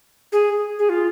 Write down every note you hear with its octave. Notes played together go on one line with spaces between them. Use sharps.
G#4
G#4
F4